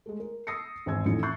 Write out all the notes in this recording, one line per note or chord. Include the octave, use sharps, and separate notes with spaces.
G#3 A3
A#4
D#6 E6 A#6 C7 C#7
G#1 E2 C5 G#5 E6 G#6
A1 F2 A2 D#3 E3 C#7
E5 C#6 F#6 G6 A6 C7